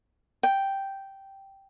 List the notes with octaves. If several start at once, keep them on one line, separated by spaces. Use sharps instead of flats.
G5